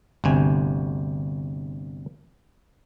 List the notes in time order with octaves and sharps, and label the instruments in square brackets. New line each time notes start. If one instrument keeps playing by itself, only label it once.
[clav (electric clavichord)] G1 D2 C3 G#5